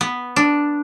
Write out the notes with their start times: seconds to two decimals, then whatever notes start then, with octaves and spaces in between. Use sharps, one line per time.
0.01 B3
0.36 D4